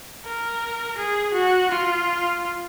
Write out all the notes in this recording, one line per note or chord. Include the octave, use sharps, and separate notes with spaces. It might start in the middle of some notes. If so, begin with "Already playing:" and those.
A#4
G#4
F#4
F4